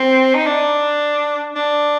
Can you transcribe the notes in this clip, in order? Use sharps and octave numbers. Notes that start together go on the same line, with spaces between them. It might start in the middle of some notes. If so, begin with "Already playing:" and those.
Already playing: C4
D#4
D4
D4